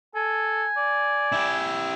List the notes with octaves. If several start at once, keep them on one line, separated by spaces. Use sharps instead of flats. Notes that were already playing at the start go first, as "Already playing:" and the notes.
A4 G#5
D5
E4 G4